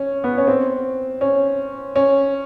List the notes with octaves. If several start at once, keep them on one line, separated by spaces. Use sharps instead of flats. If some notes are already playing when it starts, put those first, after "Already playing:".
Already playing: C#4
B3
C#4
C4
C#4
C#4